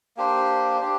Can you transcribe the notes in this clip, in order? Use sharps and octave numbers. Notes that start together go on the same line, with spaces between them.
A#3 D4 G4 C5
D4 G4